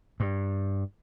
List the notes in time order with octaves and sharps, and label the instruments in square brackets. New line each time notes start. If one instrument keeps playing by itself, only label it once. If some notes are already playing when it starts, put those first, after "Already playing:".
[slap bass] G2